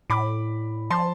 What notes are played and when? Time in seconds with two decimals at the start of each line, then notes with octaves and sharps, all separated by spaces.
0.10 A2 B5 D6
0.90 F3 A5 C6